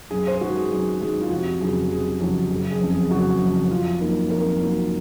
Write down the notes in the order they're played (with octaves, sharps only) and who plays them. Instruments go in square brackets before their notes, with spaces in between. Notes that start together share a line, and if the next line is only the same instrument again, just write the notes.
[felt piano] F#2 G#4
C5
D#3 G#3 F#4
G#4
F#2 G#4
D#3 G#3 G#4
F4
F1 F#4
F2 C#3 F#3 G#4
F1 G#4
F2 C#3 F#3
F#1
G#4
F2 C#3
G#4
F#1 F#4
F2 C#3
F2 F4
D#3 F#3 A#3
F2 A#4
D#3 F#3 A#3